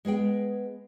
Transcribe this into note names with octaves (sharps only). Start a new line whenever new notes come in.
G#3 B3 G#4 G5